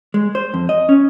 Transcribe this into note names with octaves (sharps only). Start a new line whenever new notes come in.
G#3
C5
F2
D#5
C#4